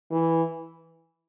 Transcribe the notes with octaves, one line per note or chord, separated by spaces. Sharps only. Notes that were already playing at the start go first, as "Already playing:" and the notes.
E3